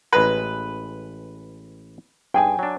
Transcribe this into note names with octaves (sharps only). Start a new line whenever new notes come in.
A1 G#3 B4 A#5
G2 G#4 G5 G#5
F#3 D4